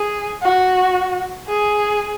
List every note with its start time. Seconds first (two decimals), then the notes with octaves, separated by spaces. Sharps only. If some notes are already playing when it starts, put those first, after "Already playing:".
Already playing: G#4
0.42 F#4
1.48 G#4